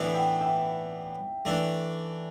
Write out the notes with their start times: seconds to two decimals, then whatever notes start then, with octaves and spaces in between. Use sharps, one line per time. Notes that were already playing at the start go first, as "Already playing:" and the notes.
Already playing: A2 E3 B3 D4
0.14 E5 G5
0.41 E5 G5
1.45 E3 A3 D4